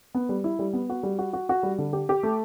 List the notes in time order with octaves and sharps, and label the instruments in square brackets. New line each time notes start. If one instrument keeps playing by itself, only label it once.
[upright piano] B3
G3
E4
G3
B3
F#4
G3
F#4
F#4
F#4
G3
D3
G4
G4
A3